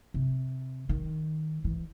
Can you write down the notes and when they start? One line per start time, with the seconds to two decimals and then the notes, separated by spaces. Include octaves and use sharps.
0.14 C3
0.89 D#3
1.64 E3